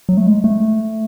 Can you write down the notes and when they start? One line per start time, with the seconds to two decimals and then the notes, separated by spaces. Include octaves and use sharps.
0.09 F#3
0.17 A3
0.26 G#3
0.44 A3